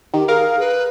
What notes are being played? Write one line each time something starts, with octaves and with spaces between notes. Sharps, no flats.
D#3 G4
G#4 A#4 F5
B4